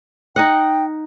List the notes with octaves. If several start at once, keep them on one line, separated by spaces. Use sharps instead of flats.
D#4 D#5 F#5 G5